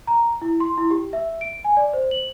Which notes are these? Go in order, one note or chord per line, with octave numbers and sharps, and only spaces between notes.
A#5
E4
C6
E4
G4
E5
D7
G#5
D5
C5
F#7